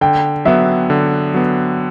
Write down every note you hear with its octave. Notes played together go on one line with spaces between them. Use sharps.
D3 G5
F#3 B3 E5
D3
F#3 B3